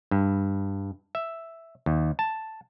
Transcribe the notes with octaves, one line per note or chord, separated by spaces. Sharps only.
G2
E5
D#2
A5